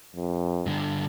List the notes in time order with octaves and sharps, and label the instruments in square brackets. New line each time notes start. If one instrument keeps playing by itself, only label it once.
[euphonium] F2
[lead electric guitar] G2 D3